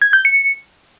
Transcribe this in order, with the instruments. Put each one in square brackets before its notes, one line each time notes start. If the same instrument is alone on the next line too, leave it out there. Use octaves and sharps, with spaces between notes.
[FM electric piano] G#6
G6
C#7